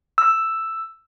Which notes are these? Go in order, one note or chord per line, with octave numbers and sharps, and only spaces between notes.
E6